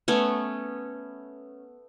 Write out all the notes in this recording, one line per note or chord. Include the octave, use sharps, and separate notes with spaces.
A3 B3 C#4